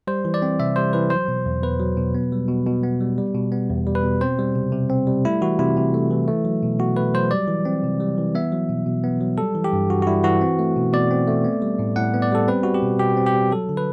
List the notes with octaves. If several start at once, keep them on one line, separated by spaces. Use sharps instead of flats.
G3 C5
E3
D5
C4
C3 E5
G3 C5
E3 B4
F#3 C5
B2
E2
E2 B4
F#3
B2
B3
G3
B2
B2
B3
G3
G3
B2
B3
E2
G3
B4
B2
C4 C5
G3
C3
C3
C4
G3
A3 E4
E3 F#4
C3 E4
C3
A3
E3
A3
F#3
B2
B2 F#4
A3 B4
F#3 C5
G3 D5
E3
C4
C3
G3
E3
B3 E5
F#3
B2
B2
B3
F#3
G3 A4
E3
G4
G2
G2 F#4
F#4
G3 E4
E3 F#4
C4
A3
B2
B2 D5
C4
A3
B3
G3
A2
A2 F#5
B3
D5
G3 A4
C4 B4
G3 F#4
G4
B2
B2 G4
C4
G4
G3
F#3 A4
D3
B4